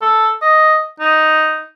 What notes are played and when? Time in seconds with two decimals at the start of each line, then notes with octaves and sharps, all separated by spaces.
0.02 A4
0.42 D#5
1.00 D#4